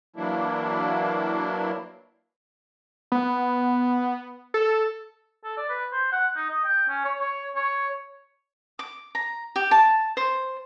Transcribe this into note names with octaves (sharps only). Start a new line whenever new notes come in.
E3 F#3 A#3 D4 E4
B3
A4
A4
D5
B4
C5
F#5
D#4
D#5
G5
C#4
C#5
C#5
C#5
D6
A#5
G4
A5
C5